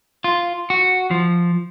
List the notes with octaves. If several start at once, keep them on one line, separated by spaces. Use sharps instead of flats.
F4
F#4
F3